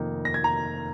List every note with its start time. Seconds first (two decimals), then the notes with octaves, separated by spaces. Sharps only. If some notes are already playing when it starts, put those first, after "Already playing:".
Already playing: F1 F2 D#3 A#3 D#4
0.25 A#6
0.34 G#6
0.44 A#5